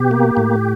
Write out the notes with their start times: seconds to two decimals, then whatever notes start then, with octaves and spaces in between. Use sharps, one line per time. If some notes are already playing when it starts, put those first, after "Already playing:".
Already playing: B2 G4
0.11 A#3
0.37 A2